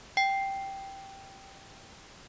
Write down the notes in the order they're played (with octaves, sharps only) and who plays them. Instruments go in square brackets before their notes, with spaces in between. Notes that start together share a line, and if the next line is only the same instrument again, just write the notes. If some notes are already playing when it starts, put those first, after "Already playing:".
[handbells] G5 C7